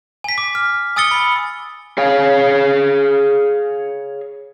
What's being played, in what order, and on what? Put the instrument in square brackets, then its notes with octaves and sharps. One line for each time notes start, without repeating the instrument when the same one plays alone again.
[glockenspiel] G#5 B6
D6
F6
G#5 D#6 E6 A6 C#7 G7
B5
[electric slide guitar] G#4 C#5 F5